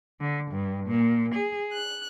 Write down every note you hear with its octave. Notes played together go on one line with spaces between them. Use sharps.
D3
G2
A#2
G#4
F#6